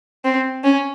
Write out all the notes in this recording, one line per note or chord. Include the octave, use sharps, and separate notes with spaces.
C4
C#4